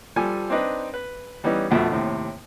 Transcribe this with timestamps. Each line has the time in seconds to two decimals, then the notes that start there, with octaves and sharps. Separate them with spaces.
0.16 F3 G3 A4 G#5
0.50 C4 D4 D#4 B4
0.94 B4
1.44 E3 G3 B3 C#4 D#4
1.71 A#1 F2 B2 A3
1.90 D#2 A2 C3